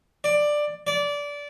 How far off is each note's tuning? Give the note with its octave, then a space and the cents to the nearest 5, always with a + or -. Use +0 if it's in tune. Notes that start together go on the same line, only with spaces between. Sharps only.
D5 +10
D5 -20